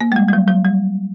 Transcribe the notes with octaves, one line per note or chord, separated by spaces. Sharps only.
A#3
G#3
G3
G3
F#3
F#3
G3